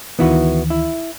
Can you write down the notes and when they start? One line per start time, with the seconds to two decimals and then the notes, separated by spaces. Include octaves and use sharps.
0.19 D2 D#3 E3 B3 E4 F#4
0.70 E4